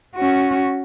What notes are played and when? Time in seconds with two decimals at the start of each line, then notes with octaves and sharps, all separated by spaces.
0.16 C#4 F#4